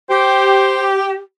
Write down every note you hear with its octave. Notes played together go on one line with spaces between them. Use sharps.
G4 C5